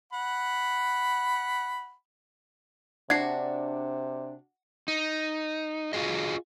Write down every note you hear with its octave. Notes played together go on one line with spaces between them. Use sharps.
F#5 B5
C3 D4 F#4 G#6 C7
D#4
F4 F#4 G#4 D#5